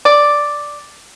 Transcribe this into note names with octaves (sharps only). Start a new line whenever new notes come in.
D5